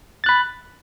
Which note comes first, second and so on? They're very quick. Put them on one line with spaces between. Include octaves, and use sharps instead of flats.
A6 F#6 B5